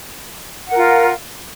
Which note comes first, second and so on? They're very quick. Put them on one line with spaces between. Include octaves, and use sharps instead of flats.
F#5 A#4 F4